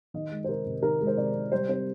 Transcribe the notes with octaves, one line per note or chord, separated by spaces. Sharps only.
D#3 D#5
G#3
C5
C3 A#4
C3
D#3 A#4
G#3
C5
C3 D5
C3
G3 C5
C4 C5